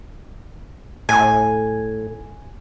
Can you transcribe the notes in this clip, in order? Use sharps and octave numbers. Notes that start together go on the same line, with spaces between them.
A2 G#5